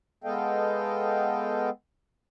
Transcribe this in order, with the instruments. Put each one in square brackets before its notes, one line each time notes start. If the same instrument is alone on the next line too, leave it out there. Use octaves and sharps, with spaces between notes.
[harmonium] G#3 B3 A4 D#5 F5 G5